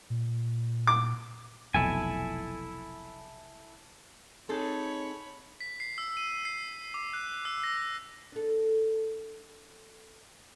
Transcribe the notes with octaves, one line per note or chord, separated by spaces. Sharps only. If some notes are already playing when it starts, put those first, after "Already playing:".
A#2
D6
F1 B1 E4 A4 G#5
C4 D#4 G#4 A4 C#5 A5 B5
B6
C7
E6
D#7
C7
D6
F#6
E6
A#6
D4 A4